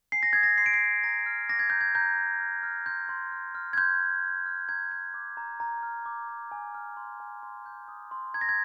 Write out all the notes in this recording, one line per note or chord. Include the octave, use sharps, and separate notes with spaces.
G#5 C7
A#6
D#6 G#6
A#6
C6 C7
D7
C7
G6
A#5 A#6
F6
D6 A#6
G#6
A#5 G6
G#6
A#5 G6
A#5
F6
F6
C6 G6
C6
F6
F6
G#6
C6 G6
C6
F6
F6
A#5 G#6
G6
D6
A#5
A#5
F6
D6
A#5
G#5
F6
C6
G#5
C6
G6
D#6
C6
A#5 G#6
A#6
G#6